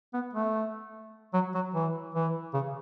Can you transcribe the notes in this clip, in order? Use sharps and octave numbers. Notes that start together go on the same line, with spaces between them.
B3
A3
F#3
F#3
E3
E3
C#3